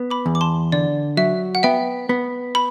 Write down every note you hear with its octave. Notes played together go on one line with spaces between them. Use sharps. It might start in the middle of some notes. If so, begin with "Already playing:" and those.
Already playing: B3
B5 D6
E2
D6
A5 C6
D3 D5
F#3 E5
F#5
B3 E5 G5
B3
B5